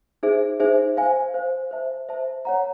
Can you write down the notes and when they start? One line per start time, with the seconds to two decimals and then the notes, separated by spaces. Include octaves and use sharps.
0.23 D#4 G#4 C5 E5
0.60 D#4 G#4 C5 E5
0.97 C5 F5 G#5
1.34 C5 F5 G#5
1.71 C5 E5 A5
2.09 C5 E5 A5
2.45 C#5 F#5 A#5